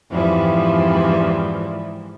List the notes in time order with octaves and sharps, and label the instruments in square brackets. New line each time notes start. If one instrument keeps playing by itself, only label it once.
[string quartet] F2 G#2 E3 F3 G3